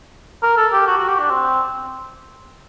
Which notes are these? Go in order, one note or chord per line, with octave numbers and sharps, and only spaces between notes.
A#4
A4
G4
F#4
F#4
G4
D4
C4